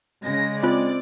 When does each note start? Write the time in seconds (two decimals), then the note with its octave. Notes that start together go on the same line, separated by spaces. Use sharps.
0.24 C#3 G#3 A#6
0.63 C4 F4 C5 D5